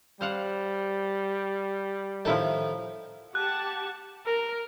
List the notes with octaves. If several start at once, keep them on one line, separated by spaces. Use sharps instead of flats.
G3 C5 F5 F#5
A2 D#3 F3 D#4 E4 A5
G4 F#5 A5 F#6
A#4